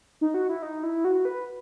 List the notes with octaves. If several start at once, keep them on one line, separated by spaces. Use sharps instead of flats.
D#4
F#4
E4
D#4
E4
F#4
B4